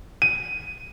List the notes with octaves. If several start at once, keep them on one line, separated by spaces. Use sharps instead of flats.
D#7